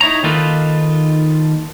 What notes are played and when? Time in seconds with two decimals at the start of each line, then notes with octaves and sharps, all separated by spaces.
0.01 D#4 E4 C#5 A#5
0.23 D#3 A#3 D#4 F4 A4 B4